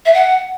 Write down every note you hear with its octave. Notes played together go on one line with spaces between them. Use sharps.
E5
F#5